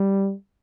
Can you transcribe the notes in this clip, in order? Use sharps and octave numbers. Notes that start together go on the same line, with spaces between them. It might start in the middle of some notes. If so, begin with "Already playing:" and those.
Already playing: G3